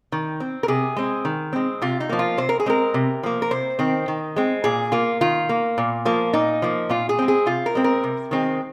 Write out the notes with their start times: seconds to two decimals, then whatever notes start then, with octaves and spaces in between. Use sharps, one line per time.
0.12 D#3
0.40 C4
0.63 A#4
0.68 C3 G#4
0.96 G#3 C4
1.25 D#3
1.53 G#3 C4
1.82 C3 F4
2.00 D#4
2.09 F3 A#3
2.19 F4
2.37 C3 C5
2.49 A#4
2.60 G#4
2.66 G#3 C4 A#4
2.94 C3
3.23 F3 A#3
3.42 A#4
3.51 C3 C5
3.79 D#3 C4
4.08 D#3
4.36 G#3 C4
4.64 A#2 G#4
4.92 A#3 F4
5.21 D#3 F4
5.49 A#3
5.78 A#2
6.05 F3 A#3
6.33 A#2 D#4
6.62 F3 A#3
6.90 A#2 F4
7.09 G#4
7.19 G#3 C4
7.28 G#4
7.46 C3 F4
7.66 A#4
7.75 G#3 C4
7.84 A#4
8.04 C3
8.31 D#3 G#3 C4